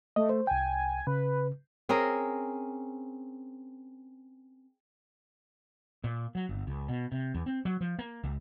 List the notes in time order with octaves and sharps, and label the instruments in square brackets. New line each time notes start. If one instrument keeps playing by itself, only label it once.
[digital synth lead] A3 [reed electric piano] D#5
[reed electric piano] C5
[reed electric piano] C2 G5 [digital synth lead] G#5
[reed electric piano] C#3 [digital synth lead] B4
[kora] C4 C#4 G#4 A#4
[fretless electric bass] A#2
F#3
G1
C#2
B2
C3
E2
C4
F#3
F3
A#3
C#2